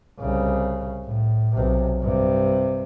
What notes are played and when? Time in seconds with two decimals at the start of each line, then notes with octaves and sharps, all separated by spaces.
0.20 C2 C#3
1.06 A2
1.55 B1 C3
2.01 G2 C3